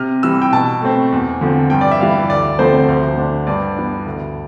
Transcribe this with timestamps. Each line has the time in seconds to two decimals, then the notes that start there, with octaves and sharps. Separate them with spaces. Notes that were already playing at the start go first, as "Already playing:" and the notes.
Already playing: C3 F6
0.23 E3 G3 E6
0.42 G5
0.52 B2 A5
0.82 A3 C4
1.12 E2
1.41 D3 F3 C4
1.70 G2 G5
1.81 D5
1.91 E5
2.00 E3 G3 F5
2.30 D2 D5
2.59 D3 F3 A3 C4 C5
2.88 D2
3.17 D3 A3 D4
3.47 G2 D5
3.77 E3 B3 D4
4.06 D2